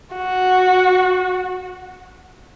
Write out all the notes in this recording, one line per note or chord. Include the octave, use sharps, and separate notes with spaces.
F#4